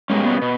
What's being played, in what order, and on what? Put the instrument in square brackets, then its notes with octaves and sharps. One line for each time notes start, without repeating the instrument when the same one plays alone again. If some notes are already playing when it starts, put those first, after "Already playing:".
[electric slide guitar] B2 G3 A#3 C#4 [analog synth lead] G#3
[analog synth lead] B3
[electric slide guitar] B2